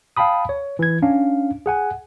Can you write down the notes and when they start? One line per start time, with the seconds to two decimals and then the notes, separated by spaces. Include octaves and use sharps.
0.17 F5 G5 A5 B5 D#6
0.49 C#5
0.79 E3 G#6
1.02 C#4 D4 F5
1.66 G#4 F#5 G#5